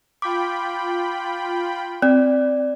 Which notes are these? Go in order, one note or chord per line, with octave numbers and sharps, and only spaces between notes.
F4 G5 B5 D6
C4 D5